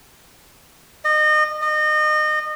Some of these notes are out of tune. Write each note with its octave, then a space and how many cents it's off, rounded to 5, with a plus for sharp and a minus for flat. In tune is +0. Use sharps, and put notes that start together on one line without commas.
D#5 -30
D#5 -30